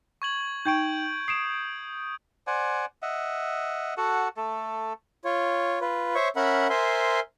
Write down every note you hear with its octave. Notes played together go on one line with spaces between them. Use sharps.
C#6 G#6 F#7
D#4 G5 C#6 G6 G#6 D7
D#6 C7 D7 E7
C5 D5 F#5 G#5
D#5 E5 F#5
F#4 A4 F#5
A3 A4
F4 C#5
F4 B4
C5 C#5 E5 C#6
C#4 A#4 E5 F#5 B5
A#4 C5 E5 G#5 C6